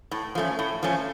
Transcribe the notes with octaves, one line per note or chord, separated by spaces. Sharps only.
A2
F3 A3 C#4
A2
F3 A3 C#4